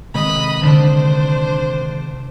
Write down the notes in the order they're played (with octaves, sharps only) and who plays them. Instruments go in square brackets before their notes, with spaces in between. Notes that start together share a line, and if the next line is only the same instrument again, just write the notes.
[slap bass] C3 D#3 G#3 [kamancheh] D#5 B5
[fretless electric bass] D3 [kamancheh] D4 C5